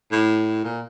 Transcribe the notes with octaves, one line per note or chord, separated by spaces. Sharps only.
A2
A#2